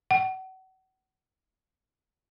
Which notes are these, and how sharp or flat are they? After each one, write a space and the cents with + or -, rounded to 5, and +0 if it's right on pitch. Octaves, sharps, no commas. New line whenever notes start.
F#5 +35